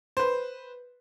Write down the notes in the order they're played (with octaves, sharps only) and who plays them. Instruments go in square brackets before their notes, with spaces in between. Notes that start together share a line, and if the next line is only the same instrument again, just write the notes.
[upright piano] B4 C5